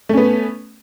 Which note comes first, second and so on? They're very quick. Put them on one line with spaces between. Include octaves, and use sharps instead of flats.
A3 C#4 B3